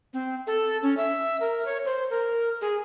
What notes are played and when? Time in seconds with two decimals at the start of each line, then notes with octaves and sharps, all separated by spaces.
0.14 C4
0.47 A4
0.82 C#4
0.97 E5
1.41 A#4
1.66 C#5
1.85 C5
2.10 A#4
2.62 G#4